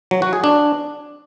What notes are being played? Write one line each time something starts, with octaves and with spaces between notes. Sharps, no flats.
F#3
F#4
G#4
D4